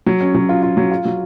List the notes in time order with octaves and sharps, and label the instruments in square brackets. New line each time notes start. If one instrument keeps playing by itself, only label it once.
[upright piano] F#3
C#4
F#3
F4
F4
F#3
F4
F#3